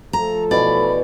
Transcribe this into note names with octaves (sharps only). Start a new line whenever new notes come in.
F3 A3 A4 A#5
B2 E3 C#5 D5 B5